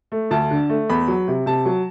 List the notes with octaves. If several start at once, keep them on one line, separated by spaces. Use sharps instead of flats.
A3
D2 A5
D3
A3
E2 B5
F#3
C3
C3 A5
F#3